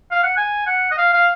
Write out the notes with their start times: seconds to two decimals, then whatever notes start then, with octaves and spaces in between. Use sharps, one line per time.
0.11 F5
0.23 F#5
0.37 G#5
0.67 F#5
0.91 D#5
0.98 F5
1.14 F5